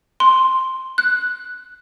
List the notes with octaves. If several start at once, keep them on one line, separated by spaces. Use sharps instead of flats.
C6
F#6